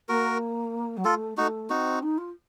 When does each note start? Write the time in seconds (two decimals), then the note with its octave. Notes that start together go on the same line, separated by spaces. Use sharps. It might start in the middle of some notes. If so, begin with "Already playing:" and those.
0.09 A#3 F#4 A#4
0.97 F#3
1.05 A3 F4 A4
1.38 A3 D#4 F#4
1.70 C4 D#4 F#4
2.03 D#4
2.18 F4